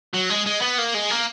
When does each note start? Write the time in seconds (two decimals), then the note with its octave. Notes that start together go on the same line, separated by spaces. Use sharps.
0.13 F#3
0.30 G#3
0.46 G#3
0.61 B3
0.78 A#3
0.94 G#3
1.10 A#3